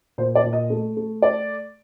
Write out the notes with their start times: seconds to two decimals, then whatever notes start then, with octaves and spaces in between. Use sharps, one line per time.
0.18 A#2 C5
0.35 D5
0.44 A#2
0.53 D#5
0.70 A3
0.97 A3
1.22 D5